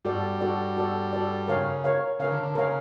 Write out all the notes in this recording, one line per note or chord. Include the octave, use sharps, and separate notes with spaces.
G2 G3 F#4 A4 D5
F#4 A4 D5
F#4 A4 D5
F#4 A4 D5
C#3 A#4 C#5 F5
A#4 C#5 F5
C#3 A#4 C#5 F5
D3
D3
C#3 A#4 C#5 F5